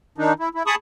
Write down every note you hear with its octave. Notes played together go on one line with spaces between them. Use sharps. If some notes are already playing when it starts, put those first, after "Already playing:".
D#3 D4 D#4
E4
E4
G#4 A5 B5 C#6 D#6